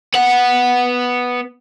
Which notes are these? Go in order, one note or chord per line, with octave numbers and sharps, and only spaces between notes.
B3 F#5